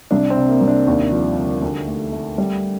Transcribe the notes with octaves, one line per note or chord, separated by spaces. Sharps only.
C2 D4
C4
C3
A#3
C2
D4
D#2
F3
D3
D2
A3
A3
G3